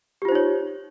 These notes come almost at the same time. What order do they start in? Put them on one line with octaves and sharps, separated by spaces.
G4 F4 C5 D#4 C#5